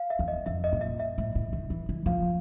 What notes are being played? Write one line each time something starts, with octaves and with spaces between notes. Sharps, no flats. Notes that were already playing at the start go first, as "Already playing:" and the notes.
Already playing: F5
E5
E2
D#5
F2 E5
D#5
A#2
E5
E5
A2
A2
D#3
E3
E3
F3 F5